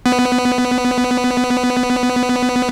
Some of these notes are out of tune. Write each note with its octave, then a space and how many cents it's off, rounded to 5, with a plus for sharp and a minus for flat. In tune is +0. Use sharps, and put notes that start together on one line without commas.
B3 +10